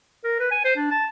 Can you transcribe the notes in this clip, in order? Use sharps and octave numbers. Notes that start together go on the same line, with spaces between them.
A#4
B4
G#5
C5
D4
A5